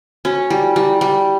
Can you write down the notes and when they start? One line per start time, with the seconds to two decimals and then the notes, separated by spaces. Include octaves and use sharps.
0.25 C#4 F#4
0.50 G3 E4
0.76 G3 E4
1.01 G3